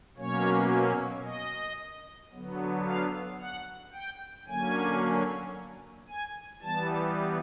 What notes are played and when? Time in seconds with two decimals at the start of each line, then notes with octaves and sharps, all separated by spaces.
0.17 B2 F#3 A#3 C#4 C#5
1.24 D#5
2.33 D3 F#3 B3
2.86 F5
3.40 F#5
3.94 G5
4.47 D3 F#3 A#3 C#4 G#5
6.09 G#5
6.62 E3 G3 B3 A5